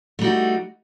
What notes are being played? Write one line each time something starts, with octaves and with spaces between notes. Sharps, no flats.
G3 A3 D#4 F#4